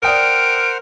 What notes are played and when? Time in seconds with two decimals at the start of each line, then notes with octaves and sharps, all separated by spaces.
0.03 A#4 C5 D5 F#5 G5 D#6 F6 D7